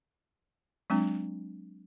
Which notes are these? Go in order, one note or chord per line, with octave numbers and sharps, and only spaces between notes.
F#3 G#3 C4 D4